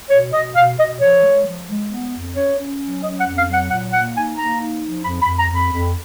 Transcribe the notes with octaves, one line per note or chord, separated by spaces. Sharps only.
B2 C#5
B2 D#5
B2 F5
B2 D#5
F3 C#5
G#3
F3
G#3
B3
F2
C#4 C#5
C#4
F#3
C#4 D#5
F#5
F2
F5
F#3
F#5
A#2 F#5
A#3 F#5
D#4 G#5
A#3 A#5
D#4
F3
F2 B5
B5
F2
A#5
F2 B5
F2